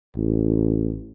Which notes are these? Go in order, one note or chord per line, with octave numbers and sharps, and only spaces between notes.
A1